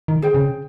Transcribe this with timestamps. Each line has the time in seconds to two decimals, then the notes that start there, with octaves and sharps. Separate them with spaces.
0.08 D#3
0.22 G#4 C5 G5
0.35 C#3